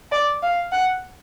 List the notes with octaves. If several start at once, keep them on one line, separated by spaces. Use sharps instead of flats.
D5
F5
F#5